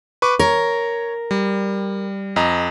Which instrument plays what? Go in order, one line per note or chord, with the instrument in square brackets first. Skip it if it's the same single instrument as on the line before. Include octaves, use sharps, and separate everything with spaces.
[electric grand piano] B4 C#6 D6
[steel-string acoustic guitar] A#4 [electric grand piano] C#5
[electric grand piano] G3
F2 D#5 A#5